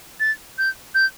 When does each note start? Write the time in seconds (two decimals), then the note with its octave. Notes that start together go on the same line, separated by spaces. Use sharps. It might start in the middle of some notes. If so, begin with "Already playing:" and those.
0.20 A6
0.58 G6
0.95 G6